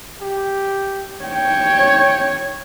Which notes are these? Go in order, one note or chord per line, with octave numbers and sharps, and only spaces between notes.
G4
C#5 G5